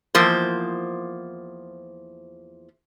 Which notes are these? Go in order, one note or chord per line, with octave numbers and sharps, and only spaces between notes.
E2 F3 A#3 C5